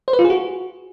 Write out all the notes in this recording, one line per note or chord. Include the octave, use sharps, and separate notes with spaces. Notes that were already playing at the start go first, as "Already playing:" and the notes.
C5
B4
F4
G#4
F#4